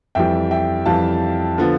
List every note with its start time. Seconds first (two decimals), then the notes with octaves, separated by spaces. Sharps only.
0.15 F2 E3 G3 E5 G5
0.51 E5 G5
0.85 F2 E3 G3 F5 A5
1.58 D3 F3 B3